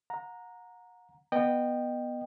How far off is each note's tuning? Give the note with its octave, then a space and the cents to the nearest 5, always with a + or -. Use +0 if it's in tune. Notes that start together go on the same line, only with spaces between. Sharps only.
F#5 -35 A#5 +0
B3 -10 D#5 -25 G5 +0